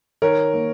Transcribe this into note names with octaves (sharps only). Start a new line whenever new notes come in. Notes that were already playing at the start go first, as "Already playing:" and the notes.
D#3 A#4 C#5
A#3